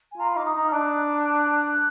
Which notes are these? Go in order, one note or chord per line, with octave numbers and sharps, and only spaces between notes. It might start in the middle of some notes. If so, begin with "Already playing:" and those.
G#5
F4 A#5
B5
D#4 D6
D#6
D#4
F6
D4 F#6
F#6